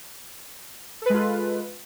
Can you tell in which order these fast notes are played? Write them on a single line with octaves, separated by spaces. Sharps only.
A4 B4 G#3 F4